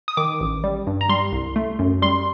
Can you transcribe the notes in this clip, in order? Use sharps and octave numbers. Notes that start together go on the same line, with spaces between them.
D#6
D#3 D6
A1
G3
G2
A#5
G3 C6
C2
A3
F#2
G3 C6